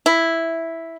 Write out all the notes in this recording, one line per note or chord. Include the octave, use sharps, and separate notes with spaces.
E4